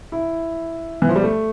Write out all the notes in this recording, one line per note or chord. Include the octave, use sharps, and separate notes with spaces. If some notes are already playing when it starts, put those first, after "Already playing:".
E4
E3
F3
G3
A3